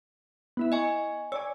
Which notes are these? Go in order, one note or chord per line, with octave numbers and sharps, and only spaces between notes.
B3 E4 E5
D#5 G#5 C#6
C#5 D5 G#5 E6